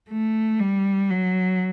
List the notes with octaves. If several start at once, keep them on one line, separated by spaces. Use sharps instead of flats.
A3
G3
F#3